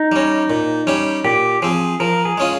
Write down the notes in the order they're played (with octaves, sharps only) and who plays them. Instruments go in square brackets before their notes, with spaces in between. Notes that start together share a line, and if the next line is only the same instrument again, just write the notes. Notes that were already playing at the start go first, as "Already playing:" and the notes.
Already playing: [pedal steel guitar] D#4
[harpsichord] G3 C#4
A#2
G3 C#4 G4
[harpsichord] A#2 [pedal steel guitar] G4
[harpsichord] F3 C4 [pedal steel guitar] G#4
[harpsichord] F3 [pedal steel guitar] A#4
[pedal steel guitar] G#4
[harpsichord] G#3 C#4 F4